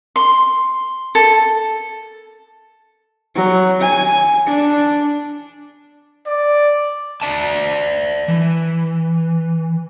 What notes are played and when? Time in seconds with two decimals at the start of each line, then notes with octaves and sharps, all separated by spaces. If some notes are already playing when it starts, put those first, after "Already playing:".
0.16 C6
1.15 A4
3.35 F#3
3.81 G#5
4.46 D4
6.27 D5
7.22 D5 E5 A5
8.28 E3